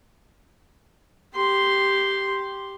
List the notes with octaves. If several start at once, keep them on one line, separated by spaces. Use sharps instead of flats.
G4 C6